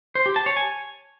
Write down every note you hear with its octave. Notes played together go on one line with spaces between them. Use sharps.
C5
G4
A5
C#5
G#5